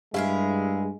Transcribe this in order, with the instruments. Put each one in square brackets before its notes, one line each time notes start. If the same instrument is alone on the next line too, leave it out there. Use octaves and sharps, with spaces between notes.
[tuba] G2 [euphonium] G#3 [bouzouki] E4 G#4 A#4 [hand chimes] G4 F5